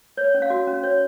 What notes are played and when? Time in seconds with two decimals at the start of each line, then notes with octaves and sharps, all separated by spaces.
0.17 C#5
0.34 C#4
0.42 F5
0.50 F#4
0.67 C#4
0.83 C#5